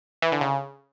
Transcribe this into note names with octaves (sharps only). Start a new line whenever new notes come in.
E3
D3
C#3